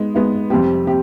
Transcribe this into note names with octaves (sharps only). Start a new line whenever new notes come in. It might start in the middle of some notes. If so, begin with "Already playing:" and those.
Already playing: G#3 B3 D#4
G#3 B3 D#4
F2 C3 G3 C4 G4
C4 G4